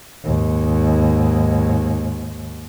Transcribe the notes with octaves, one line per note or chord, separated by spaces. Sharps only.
D#2 G#2